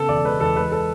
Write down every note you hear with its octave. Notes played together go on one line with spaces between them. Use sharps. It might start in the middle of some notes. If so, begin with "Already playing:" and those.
Already playing: C#3 B3 A4
E1 D5
G#3 B4
E2 A4
G#3 B4
A4